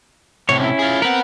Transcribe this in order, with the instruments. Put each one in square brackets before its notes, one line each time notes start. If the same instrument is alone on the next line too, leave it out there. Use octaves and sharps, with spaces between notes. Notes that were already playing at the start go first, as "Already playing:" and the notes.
[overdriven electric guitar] A2 C3 [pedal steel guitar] C#5
[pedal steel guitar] C#4 E4
[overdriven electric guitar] F4 G#4
[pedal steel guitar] C4 A#4 [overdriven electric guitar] B4 F#5